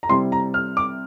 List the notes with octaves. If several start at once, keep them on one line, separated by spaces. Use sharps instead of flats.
A#5
C3 G3 C4 E4 C6
A#5
F6
D6